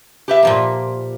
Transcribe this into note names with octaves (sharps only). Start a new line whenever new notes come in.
G4 B4 E5
A#2 F3 A#3